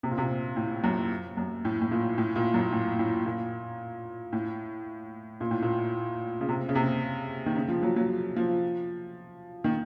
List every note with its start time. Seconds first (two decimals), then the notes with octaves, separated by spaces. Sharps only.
0.03 C3
0.11 A#2
0.18 C3
0.56 A2
0.84 F#2
1.37 F#2
1.65 A2
1.81 A2
1.91 A#2
2.18 A2
2.36 A#2
2.54 F#2
2.72 A2
2.99 A2
3.26 A#2
4.33 A2
5.41 A#2
5.51 A2
5.62 A#2
6.40 C#3
6.48 C3
6.69 C#3
6.75 C3
7.46 D#3
7.55 C#3
7.68 F3
7.83 F#3
7.96 F#3
8.36 F3
9.64 D#3